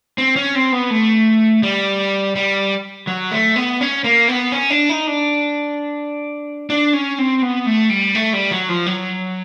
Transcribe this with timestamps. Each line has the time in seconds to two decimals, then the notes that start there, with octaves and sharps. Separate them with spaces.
0.18 C4
0.36 C#4
0.55 C4
0.72 B3
0.90 A3
1.63 G3
2.36 G3
3.07 F#3
3.32 A3
3.56 B3
3.81 C#4
4.04 A#3
4.28 B3
4.52 C#4
4.70 D4
4.89 D#4
5.07 D4
6.70 D4
6.93 C#4
7.18 C4
7.42 B3
7.66 A3
7.90 G3
8.15 A3
8.33 G3
8.51 F#3
8.69 F3
8.86 F#3